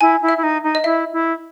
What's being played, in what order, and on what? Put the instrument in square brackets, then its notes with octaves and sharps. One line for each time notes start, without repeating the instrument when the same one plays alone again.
[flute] E4 [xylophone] G#5
[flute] E4
[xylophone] E5
[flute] E4
D#4
D#4
[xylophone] D#5
[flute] E4 [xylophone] E5
[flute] E4